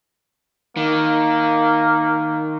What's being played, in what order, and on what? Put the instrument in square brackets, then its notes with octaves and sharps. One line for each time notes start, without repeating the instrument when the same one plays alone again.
[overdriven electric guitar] D#3 [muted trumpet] A#3